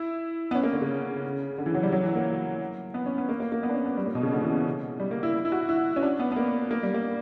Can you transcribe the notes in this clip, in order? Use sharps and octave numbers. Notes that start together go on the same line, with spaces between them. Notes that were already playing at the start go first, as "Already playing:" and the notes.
Already playing: E4
B3
C#4
A#3
D3
C#3
D3
E3
F#3
G3
F#3
E3
A#3
B3
C#4
B3
A#3
A#3
A#3
B3
D4
C#4
B3
G3
A#2
B2
C#3
D3
E3
G3
A#3
E4
E4
F#4
E4
C#4
D4
B3
B3
A#3
A#3
G3
A#3